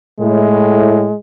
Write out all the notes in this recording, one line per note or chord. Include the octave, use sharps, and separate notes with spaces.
A2 G#3